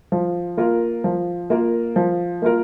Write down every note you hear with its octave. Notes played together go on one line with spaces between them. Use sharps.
F3
A#3 F4 A#4
F3
A#3 F4 A#4
F3
A#3 F4 A#4